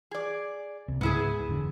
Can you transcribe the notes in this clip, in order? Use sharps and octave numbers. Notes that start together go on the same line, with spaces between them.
G#4 D5
C2
C#2 G#2 B3 E4 G#4
E1 D3